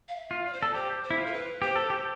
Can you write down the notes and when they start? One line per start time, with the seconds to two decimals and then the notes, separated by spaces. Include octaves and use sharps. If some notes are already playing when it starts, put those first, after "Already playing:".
0.09 F5
0.16 E5
0.31 F4
0.45 D5
0.53 C5
0.61 A4 D5
0.74 G4 C5
1.03 C5
1.10 E4
1.18 F4
1.26 A4
1.33 B4
1.62 G4 C5
1.76 A4
1.90 G4